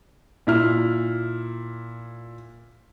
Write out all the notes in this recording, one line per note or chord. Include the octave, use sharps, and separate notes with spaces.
A#2 E4 F6